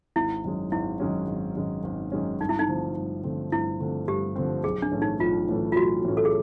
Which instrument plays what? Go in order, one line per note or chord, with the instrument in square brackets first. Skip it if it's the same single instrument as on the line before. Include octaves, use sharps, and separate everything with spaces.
[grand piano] G#1 [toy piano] E4
[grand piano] F#2 D#3 G#3 C#4
[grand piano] G#1 [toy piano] E4
[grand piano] F#2 D#3 G#3 C#4
G#1
F#2 D#3 G#3 C#4
G#1
F#2 D#3 G#3 C#4
[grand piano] G2 [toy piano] D#4
[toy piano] E4
D#4
[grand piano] D3 F3 A3 C4
G2
D3 F3 A3 C4
[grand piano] G2 [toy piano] E4
[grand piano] D3 F3 A3 C4
[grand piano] G2 [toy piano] G4
[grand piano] D3 F3 A3 C4
[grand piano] B1 [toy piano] G#4
[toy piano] D4
[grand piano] A2 E3 A3 C#4
[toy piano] D#4
[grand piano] B1 [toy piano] F4
[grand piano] A2 E3 A3 C#4
[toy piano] F4
[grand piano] B1 [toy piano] F#4
[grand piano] A2 E3 A3 C#4
[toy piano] A4
G#4